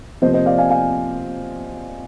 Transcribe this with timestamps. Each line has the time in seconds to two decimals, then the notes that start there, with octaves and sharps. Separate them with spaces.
0.22 C3 F3 A#3 C5 D#5
0.34 C5 D#5
0.46 D5 F5
0.58 F5 G#5
0.70 F5 G#5